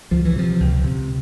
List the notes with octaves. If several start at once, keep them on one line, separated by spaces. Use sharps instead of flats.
C#2 F3
E3
C3 F3
C#2
C3